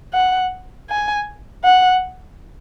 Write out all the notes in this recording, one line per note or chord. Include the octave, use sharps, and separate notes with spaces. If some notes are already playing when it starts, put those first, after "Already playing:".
F#5
G#5
F#5